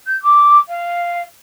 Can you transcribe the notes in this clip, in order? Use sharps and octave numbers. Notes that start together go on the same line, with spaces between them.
G6
D6
F5